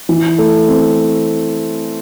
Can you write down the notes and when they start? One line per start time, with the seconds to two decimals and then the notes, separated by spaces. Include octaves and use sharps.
0.09 E3
0.38 A3
0.68 C4